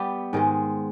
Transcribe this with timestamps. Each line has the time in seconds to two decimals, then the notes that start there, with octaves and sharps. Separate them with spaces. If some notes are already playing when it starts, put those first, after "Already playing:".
Already playing: G3 B3 G4
0.33 G#2 D#3 G#3